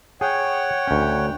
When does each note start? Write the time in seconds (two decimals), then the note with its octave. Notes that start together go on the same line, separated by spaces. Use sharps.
0.21 G#4 C#5 F#5 G5
0.88 D2 C#4